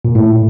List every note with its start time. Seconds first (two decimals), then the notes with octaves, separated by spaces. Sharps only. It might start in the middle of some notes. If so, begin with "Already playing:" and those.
0.05 A#2
0.15 A2